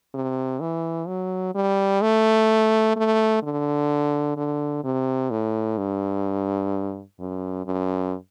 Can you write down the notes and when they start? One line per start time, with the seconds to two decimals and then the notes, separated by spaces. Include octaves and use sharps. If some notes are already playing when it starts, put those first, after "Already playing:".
0.14 C3
0.61 E3
1.07 F#3
1.55 G3
2.02 A3
2.96 A3
3.43 D3
4.37 D3
4.84 C3
5.30 A2
5.78 G2
7.19 F#2
7.66 F#2